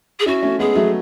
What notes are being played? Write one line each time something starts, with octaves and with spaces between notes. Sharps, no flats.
G#4
C#4 E4 F#4
A3 C#4
G#3 B3 G#4
F#3 A3